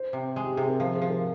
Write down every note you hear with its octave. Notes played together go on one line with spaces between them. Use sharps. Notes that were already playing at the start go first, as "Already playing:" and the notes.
Already playing: C5
C3
G#3
G4
C3 G#4
A#4
F3 C5
G#4
F3
A#4